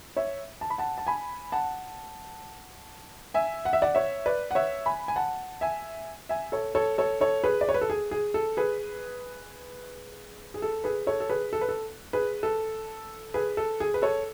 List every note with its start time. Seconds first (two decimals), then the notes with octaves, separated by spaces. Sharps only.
0.17 C#5 E5
0.61 A5
0.70 B5
0.78 F#5 A5
0.98 A5
1.07 G#5 B5
1.52 F#5 A5
3.34 E5 G#5
3.65 F#5
3.73 E5
3.82 D5 F#5
3.95 C#5 E5
4.26 B4 D5
4.51 F#5
4.55 C#5 E5
4.86 G#5 B5
5.08 G#5
5.16 F#5 A5
5.61 E5 G#5
6.29 E5 G#5
6.52 A4 C#5
6.75 A4 C#5
6.98 A4 C#5
7.21 A4 C#5
7.44 G#4 B4
7.61 D5
7.69 C#5
7.74 B4
7.81 A4
7.90 G#4
8.11 G#4
8.34 A4
8.57 G#4 B4
10.54 G#4
10.62 A4
10.84 G#4 B4
11.07 A4 C#5
11.20 A4
11.29 G#4 B4
11.53 A4
11.61 B4
11.69 A4
12.13 G#4 B4
12.43 A4
13.34 G#4 B4
13.57 A4
13.80 G#4
13.94 B4
14.02 A4 C#5